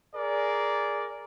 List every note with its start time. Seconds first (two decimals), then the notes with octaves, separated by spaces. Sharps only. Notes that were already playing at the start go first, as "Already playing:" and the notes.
0.15 G#4 A#4 D5